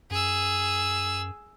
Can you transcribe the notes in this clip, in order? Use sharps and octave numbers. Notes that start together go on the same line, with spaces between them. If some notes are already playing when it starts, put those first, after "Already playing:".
F#2 G#4 E6